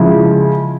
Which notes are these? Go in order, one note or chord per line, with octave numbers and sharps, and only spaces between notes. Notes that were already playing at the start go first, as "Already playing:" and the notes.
Already playing: C#3 F3 G#3 E4